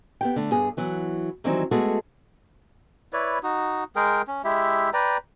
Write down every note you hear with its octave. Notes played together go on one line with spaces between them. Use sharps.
B3 G4 G5
D3 A3
G2 B3 G#4
E3 F#3 B3
D#3 E3 F#3 G3 C4 D#4
G#3 A3 B3 F#4 G#4 A4
E4 B4 C#5 D5
D#4 F#4
G#3 G#4 A#4 G5
C#4
G#3 E4 G4 E5
B4 D5 G5 A#5